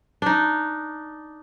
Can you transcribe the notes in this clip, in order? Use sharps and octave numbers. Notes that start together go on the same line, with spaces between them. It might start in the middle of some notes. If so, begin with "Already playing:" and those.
D4 D#4